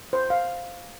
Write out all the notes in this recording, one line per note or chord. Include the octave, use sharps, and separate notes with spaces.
C5
F5